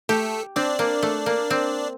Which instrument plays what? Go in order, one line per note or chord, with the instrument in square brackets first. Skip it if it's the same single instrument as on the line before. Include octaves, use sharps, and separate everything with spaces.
[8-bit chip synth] A3 A4 [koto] G4
[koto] C4 [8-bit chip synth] D4 D5
[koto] A#3
A3
A#3
C4